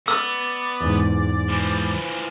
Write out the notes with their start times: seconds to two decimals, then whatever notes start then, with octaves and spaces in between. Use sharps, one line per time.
0.08 B3 D5 E6
0.81 E2 G#2
1.50 E3 F3